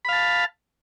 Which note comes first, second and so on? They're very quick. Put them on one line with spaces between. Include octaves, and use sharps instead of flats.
B5 F5 A5